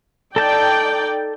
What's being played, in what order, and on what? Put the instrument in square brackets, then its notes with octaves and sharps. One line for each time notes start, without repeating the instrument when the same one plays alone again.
[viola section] D#4 D5 G5 [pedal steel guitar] A4 A5 G6